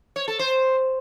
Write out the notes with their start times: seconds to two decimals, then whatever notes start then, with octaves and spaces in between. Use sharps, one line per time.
0.16 C#5
0.28 A4
0.39 C5